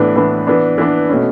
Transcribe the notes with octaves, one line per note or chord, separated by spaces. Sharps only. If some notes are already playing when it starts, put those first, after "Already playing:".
Already playing: A2 E3 B3 D4
A2 E3 B3 D4
E3 B3 D4
E3 B3 D4
B2 A3 C#4